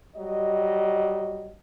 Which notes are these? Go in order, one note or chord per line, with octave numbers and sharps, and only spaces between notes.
F#3 G3 D#5